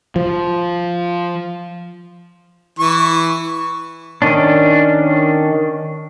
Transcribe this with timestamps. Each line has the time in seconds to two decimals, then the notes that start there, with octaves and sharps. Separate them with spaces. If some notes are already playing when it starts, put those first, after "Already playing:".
0.16 F3
2.79 E3 C#6
4.22 D#3 C#4 D4